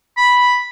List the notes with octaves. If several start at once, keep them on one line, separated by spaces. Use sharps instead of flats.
B5